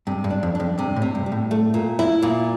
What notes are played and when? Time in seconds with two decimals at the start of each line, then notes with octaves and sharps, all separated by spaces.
0.07 G2 C3
0.24 G2
0.30 D4
0.43 F2
0.55 F2 D4
0.78 G2 C3
0.96 A2
1.02 C3
1.15 G2
1.26 G3
1.32 A2
1.51 A3
1.74 A#2
1.99 E4
2.22 A#2